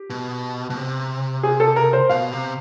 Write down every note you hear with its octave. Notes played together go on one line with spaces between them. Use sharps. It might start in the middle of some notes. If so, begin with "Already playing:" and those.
Already playing: G4
B2
B2
C3
G#4
A4
A#4
C5
B2 F5
C3